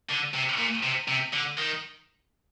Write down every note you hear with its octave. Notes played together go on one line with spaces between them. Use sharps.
D3
C3
A#2
C3
C3
D3
D#3